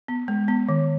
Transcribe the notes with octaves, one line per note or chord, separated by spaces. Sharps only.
B3
G#3
B3
D#3